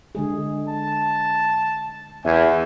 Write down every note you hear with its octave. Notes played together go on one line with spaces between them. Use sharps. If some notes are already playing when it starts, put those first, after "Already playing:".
D3 G#3 G#4
A5
E2 E5 G#5